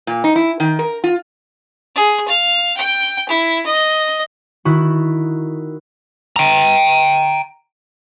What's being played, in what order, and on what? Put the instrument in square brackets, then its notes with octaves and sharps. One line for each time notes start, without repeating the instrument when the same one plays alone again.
[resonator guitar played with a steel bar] A#2
D#4
E4
D#3
A#4
F4
[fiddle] G#4
F5
G5
E4
D#5
[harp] D#3 E4 F#4
[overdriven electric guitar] G5 A#5